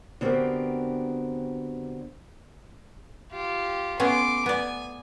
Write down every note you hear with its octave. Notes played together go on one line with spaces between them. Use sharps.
D3 B3 C4 F#4 G4 A#4
F4 G4
A3 B3 C#4 C6 D6
B3 D5 G#5